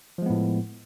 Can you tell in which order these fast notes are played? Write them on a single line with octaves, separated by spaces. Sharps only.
F3 G#3 B3 A2